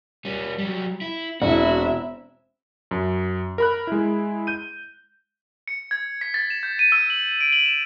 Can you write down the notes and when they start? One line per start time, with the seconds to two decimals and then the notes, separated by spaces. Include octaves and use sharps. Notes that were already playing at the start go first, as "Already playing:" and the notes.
0.25 G3 C#4
0.58 F#3 G3
1.01 E4
1.42 E1 C4 E4 F#4 E5
2.91 F#2
3.58 A#4 B5 F#6
3.87 G#3 E4
4.47 G6 D#7
5.68 C#7
5.91 G#6
6.21 B6
6.34 A6
6.50 E7
6.63 G6
6.79 D#7
6.92 E6
7.10 F#7
7.41 D7
7.52 F#7
7.66 E7